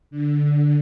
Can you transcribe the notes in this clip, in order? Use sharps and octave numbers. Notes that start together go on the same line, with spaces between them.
D3